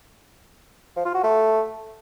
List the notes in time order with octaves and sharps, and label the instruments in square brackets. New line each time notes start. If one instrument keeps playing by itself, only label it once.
[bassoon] F3
F4
F#4
A3